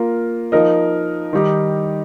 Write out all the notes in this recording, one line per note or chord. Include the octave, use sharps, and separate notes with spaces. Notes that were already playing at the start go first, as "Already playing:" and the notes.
Already playing: A#3 F4 A#4
F3 D#4 A#4 D#5
D#3 G3 D#4 G4